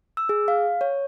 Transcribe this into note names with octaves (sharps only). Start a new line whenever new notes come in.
E6
G#4
F5
C#5